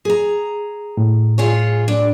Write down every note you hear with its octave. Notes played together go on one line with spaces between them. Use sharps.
G#4 A#5
A2
F4 G#4 C#5
D4